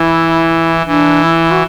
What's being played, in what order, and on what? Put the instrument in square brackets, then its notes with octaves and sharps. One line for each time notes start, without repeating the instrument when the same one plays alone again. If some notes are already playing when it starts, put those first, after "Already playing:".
Already playing: [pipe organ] E3 [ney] E4
[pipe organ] E3 [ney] D4
[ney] E4
F#4